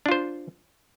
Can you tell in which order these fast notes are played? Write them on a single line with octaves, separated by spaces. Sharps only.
D4 F4 C5